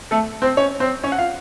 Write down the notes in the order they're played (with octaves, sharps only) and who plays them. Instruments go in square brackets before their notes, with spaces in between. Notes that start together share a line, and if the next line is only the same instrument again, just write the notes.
[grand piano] A3 A4
C4 C5
C#4 C#5
C4 C5
C#4 C#5
F#5
F4 F5